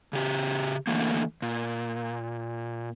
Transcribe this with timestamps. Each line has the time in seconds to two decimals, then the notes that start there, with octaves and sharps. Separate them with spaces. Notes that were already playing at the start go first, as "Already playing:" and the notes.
0.13 C#3 G4
0.87 D3 E3 A3 A#3
1.42 A#2